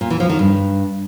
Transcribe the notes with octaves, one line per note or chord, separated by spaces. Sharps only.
A#2
E3
F3
D#3
G2